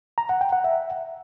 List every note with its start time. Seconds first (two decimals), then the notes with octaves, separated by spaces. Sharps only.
0.18 A#5
0.29 F#5
0.41 G5
0.53 F#5
0.64 E5